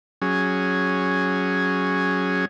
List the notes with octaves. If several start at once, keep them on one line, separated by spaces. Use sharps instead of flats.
F#3 C#4 G#4